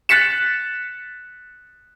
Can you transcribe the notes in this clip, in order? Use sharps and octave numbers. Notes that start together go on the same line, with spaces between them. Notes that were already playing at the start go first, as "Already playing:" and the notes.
F#6 A6 B6 C#7 E7